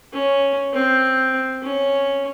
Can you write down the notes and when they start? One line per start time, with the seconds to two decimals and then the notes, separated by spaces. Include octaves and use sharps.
0.13 C#4
0.73 C4
1.63 C#4